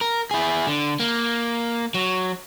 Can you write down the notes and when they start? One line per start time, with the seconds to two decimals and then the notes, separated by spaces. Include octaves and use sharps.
0.01 A#4
0.31 E4 G#4
0.67 D3
1.00 A#3
1.94 F#3